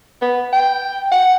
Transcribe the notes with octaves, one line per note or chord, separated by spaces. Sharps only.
B3
G5
F#5